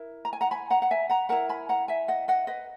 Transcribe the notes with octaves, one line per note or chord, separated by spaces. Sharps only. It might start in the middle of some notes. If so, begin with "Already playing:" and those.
Already playing: E4 A#4
A#5
G#5
F#5 A#5
G#5 B5
F#5 A#5
F#5
E5 G#5
F#5 A#5
E4 A#4 F#5 A#5
G#5 B5
F#5 A#5
E5 G#5
D#5 F#5
D#5 F#5
B4 D#5